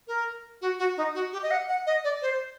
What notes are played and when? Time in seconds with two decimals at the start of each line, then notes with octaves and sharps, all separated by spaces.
0.08 A#4
0.62 F#4
0.79 F#4
0.97 D#4
1.15 F#4
1.33 G4
1.43 D#5
1.51 F#5
1.69 F#5
1.86 D#5
2.04 D5
2.22 C5